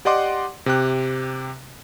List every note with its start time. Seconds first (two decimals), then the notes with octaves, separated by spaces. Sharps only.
0.05 G4 D5 D#5 F#5 C6 D6
0.66 C3 G4 F#6